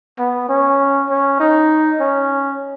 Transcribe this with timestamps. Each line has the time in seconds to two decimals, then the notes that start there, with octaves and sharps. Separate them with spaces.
0.19 B3
0.49 C#4
1.10 C#4
1.40 D#4
2.00 C#4